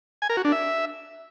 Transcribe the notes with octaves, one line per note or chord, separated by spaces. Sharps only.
G#5
A#4
F#4
D4
E5